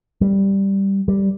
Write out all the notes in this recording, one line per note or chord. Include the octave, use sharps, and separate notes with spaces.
G3
G3